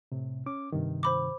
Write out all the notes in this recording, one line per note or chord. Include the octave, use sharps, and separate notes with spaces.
A2 C3
C#4 D6
G2 C3 D#3
C5 B5 D6